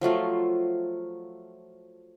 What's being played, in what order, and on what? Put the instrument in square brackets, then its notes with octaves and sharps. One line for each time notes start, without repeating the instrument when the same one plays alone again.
[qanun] F3 F#3 A3 F4